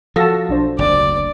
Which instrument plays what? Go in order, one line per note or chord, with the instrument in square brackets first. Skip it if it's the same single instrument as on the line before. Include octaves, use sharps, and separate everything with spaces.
[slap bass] F3 [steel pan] F#4 A4 [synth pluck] F5 A5 A#6
[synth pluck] B1 D4 C5
[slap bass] F#1 D2 [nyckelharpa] D5